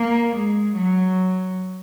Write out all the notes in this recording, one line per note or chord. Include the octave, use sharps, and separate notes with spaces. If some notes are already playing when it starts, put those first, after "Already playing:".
Already playing: A#3
G#3
F#3